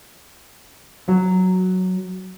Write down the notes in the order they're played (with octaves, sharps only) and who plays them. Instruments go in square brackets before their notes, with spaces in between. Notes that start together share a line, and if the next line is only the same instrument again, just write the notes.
[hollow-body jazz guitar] F#3